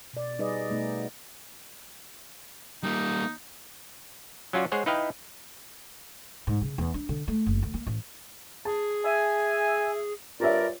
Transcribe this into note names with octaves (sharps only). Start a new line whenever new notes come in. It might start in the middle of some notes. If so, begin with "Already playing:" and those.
B2 D5
G3 D#4 G#4 B4 D5 D#5
B2 A3 B3 D#4
G3 A#3 D#4
F#3 C#4 F4 F#4 D5
G#3 G#4 C5 C#5 F#5
D#4 E4 B4 D#5 F5 G5
G#2
C#3
E2
D4
D3
A3
F#1
D2
A#3
A1
G#4 A5
E5 G#5
G2 F4 A#4 C#5 D5 E5